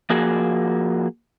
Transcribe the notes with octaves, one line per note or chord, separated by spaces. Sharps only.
F3 A#3 F#4 G#4